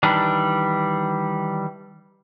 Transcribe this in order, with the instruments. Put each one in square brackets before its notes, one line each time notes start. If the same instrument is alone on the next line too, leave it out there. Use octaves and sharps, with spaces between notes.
[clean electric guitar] D#3 E3 G3 D4